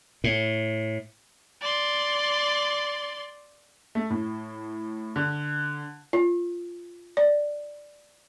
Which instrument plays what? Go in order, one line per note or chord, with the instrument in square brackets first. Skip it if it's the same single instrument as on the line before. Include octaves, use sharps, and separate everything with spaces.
[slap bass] A2
[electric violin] D5 C6
[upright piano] A3
A2
D3
[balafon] F4
D5